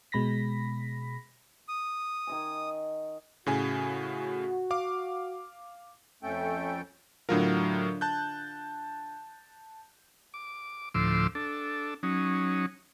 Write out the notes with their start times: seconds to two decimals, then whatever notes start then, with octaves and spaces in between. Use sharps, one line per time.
0.12 B2 G#3 B5 A#6 B6
1.68 D#6
2.27 D#3 D#5 G#5
3.46 A2 C#3 F#4 G#5
4.71 F5 D6
6.23 F2 A3 C#4 A4 G5
7.29 A2 D3 F#3 F4 A#4
8.01 A5 F#6 G6
10.34 D6
10.94 D2 A2 F3 C6 D6 E6
11.35 D4 A4
12.03 F#3 C#4 D#4